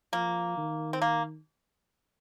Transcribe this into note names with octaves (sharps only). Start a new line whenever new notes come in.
F3 A#3
D#3
C4
A#3